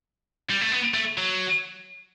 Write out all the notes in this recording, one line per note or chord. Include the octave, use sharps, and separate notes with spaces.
G3
A3
B3
A3
F#3